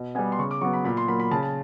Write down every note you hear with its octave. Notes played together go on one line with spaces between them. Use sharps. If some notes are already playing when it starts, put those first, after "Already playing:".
Already playing: B2
G3 B3 G#5
C6
C#3 C#6
D6
F#3 B3 C#6
B5
A#2 B5
C6
F#3 A#3 B5
B5
C#3 A5
A5